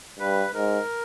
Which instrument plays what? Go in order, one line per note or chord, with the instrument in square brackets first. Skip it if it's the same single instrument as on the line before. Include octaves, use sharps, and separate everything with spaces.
[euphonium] G2 [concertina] B4
[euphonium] G#2 [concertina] A#4